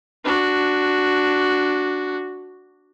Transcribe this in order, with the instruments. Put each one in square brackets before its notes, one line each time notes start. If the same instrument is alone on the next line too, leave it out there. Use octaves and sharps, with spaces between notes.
[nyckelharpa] D4 F#4